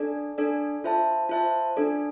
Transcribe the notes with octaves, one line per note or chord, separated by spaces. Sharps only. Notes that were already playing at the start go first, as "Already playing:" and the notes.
Already playing: D4 A4 D5
D4 A4 D5
F4 C5 E5 A5
F4 C5 E5 A5
D4 A4 D5